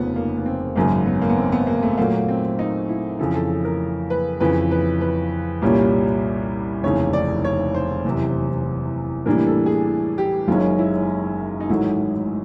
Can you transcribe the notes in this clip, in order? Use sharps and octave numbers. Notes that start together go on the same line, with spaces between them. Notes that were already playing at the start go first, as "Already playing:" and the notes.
Already playing: F1 D#2 C#3 F3 B3
A#3
B3
C4
G#1 F#2 C#3 A#3
B3
A#3
B3
C4
B3
A#3
A3
A#2 F#3 A3 A#3
C4
D#4
E4
F2 C#3 E3 A4
A4
A4
A#4
B4
F2 C#3 E3 B4
B4
B4
C2 A#2 G3 A#3 C#4
F1 D#2 C#3 E3 C#5
D5
C#5
C5
F#1 E2 C3
A2 E3 G3 A#3 D4 A#4
A4
G#4
G4
F#1 F#2 D#3 G#3 C#4 F4
E4
D#4
A1 G#2 D#3 F#3 A3 E4